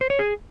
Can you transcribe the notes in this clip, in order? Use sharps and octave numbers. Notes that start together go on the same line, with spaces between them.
C5
C#5
G#4